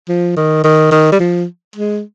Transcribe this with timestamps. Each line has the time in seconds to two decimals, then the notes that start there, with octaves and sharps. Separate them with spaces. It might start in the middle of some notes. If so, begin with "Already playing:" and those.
0.08 F3
0.36 D#3
0.64 D#3
0.91 D#3
1.12 G3
1.19 F3
1.76 G#3